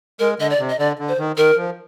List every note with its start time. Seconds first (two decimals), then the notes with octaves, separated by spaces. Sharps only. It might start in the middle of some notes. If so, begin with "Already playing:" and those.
0.19 G#3 A#4
0.40 D3 D#5
0.50 D5
0.59 C3
0.69 D#5
0.79 D3 D5
0.99 D3
1.08 C5
1.18 D#3
1.37 D#3 A#4
1.57 F3